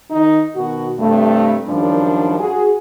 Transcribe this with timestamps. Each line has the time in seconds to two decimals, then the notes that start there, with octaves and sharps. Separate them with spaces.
0.10 D#3 D#4
0.56 B2 D#3 F#4
0.99 G2 C3 A3
1.68 F#2 D#3 F3 G3 D4
2.39 F#4 G#4